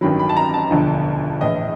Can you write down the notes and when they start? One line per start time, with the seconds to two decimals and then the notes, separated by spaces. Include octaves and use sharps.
0.01 A1 G2 D#3 F#3 B5
0.19 B5
0.29 A5
0.37 A#5
0.54 A5
0.71 E1 D2 D3 F3
1.40 A#1 A2 E3 D#5